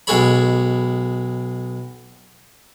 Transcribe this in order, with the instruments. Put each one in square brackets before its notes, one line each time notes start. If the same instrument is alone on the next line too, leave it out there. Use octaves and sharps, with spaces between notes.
[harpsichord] B1 G#3 A4 C#5 B5